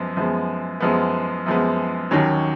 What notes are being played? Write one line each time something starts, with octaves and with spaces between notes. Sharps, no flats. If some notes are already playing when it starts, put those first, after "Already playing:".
Already playing: F#2 F3 G#3 B3
F#2 F3 G#3 B3
F#2 F3 G#3 B3
F#2 F3 G#3 B3
D#2 D#3 F#3 C#4